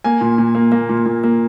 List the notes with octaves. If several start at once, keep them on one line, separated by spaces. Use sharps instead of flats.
A#3 G#5
A#2
A#2
A#3
A#3
A#2
A#2
A#3